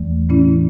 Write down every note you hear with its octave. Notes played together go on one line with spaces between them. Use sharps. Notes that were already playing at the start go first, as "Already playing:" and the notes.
Already playing: E2 E3 A3
A2 E3 C#4 E4